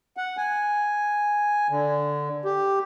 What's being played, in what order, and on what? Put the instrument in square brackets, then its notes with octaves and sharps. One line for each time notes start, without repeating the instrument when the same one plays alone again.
[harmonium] F#5
G#5
D3
G4